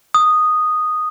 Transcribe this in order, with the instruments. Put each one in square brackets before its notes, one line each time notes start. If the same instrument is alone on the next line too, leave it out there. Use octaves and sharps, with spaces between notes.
[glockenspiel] D#6